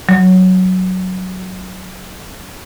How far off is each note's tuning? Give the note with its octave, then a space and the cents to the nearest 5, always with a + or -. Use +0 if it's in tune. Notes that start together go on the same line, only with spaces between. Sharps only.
F#3 +0